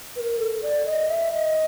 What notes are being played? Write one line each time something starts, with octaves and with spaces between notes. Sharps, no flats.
B4
A#4
A4
D5
D#5
E5
D#5